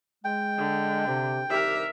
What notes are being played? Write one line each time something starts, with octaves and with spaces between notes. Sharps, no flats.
G#3 G5
D3
C3
C2 D#3 G4 A#4 E5